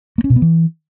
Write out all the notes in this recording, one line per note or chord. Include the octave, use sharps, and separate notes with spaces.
A#3
C#4
B2
B3
E3